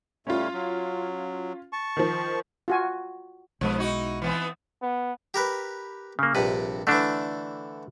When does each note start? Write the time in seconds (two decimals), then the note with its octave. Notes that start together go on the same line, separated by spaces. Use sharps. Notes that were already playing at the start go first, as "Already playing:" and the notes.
0.27 A2 G3 A3 C#4 F4
0.53 F#3
1.73 A5 C#6
1.97 D#3 F3
2.68 F4 F#4 G#5
3.61 B1 F3 G#3 B3
3.78 D#4 E4 F#4
4.22 E3 B3 C4
4.82 B3
5.34 G4 A#4 B4
6.19 C#3 A#3
6.35 A#1 G2 C3 B4
6.87 D3 E3 A3 D4